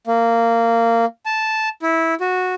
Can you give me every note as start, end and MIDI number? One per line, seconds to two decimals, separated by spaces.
0.07 1.05 58
1.26 1.69 81
1.82 2.14 64
2.20 2.55 66